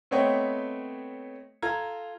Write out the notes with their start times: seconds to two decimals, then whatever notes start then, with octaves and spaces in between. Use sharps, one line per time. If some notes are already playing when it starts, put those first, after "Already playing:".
0.11 A3 B3 C4 C#5 D#5 G5
1.62 F4 A4 A#5 G#6